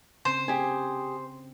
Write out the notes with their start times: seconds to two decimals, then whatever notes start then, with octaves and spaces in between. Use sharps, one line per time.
0.25 C#3 C4 C5
0.48 C4 G4 G#4 G#5